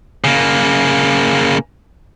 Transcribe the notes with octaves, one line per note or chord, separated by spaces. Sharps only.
C#3 A#3